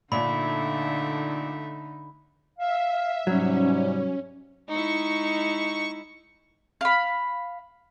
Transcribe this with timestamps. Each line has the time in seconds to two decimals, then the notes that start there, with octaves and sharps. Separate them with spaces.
0.12 A#2 D3 A3 D4 D#4 E5 B5
2.59 E5 F5
3.27 G#2 C3 F#3 G3 C#4
4.69 G#3 D#4 E4 C#6
6.81 F5 B5